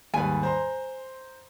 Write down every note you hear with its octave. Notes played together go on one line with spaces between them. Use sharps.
D#2 G#2 G3 B4 G#5
C5 A#5 C6